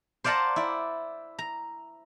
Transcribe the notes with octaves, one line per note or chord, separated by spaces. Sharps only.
C5 D5 F5 F#5 A5 A#5
E4 D5
A#5